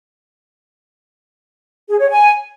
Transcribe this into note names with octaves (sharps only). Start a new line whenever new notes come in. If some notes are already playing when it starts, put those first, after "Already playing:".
G#4
C#5
G#5